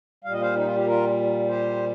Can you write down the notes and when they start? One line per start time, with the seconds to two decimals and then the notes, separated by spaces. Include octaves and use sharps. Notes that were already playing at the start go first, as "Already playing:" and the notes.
0.24 A#2 G3 F5
0.33 D#5
0.41 C5 F5
0.55 D#4
0.65 F4
0.76 G4
0.86 F4 A#4
1.48 G4 C5